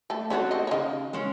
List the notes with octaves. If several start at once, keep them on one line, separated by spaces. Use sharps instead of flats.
A3 A4
C4 C#4 F#4 A4 C#5
D#4 D#5
C#5
C#3 D#4 D#5
G#3 C#4